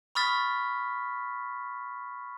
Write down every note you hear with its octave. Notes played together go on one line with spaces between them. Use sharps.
B5 C#6 D#6 F6 A6 B6